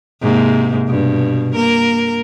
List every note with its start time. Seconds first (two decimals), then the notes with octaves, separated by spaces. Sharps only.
0.21 G#2 C3 A#3
0.87 G2 B2
1.53 A#3 A#4